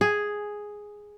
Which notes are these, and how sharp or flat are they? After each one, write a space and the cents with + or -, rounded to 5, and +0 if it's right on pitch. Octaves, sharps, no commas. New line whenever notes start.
G#4 +0